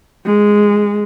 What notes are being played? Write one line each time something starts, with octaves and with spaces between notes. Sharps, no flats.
G#3